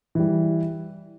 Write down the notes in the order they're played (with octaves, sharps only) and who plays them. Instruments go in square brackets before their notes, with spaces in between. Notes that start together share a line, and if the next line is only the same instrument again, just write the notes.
[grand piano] E3 G3